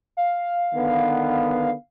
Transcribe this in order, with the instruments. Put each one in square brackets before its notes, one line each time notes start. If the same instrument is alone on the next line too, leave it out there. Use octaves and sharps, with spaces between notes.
[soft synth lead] F5
[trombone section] D3 D#3 B3